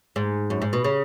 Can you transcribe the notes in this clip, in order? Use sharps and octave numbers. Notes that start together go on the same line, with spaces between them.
G#2
F#2
G#2
B2
C#3